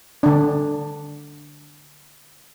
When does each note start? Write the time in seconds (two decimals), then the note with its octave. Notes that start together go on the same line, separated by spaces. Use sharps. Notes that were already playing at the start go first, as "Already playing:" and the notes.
0.23 D3 D4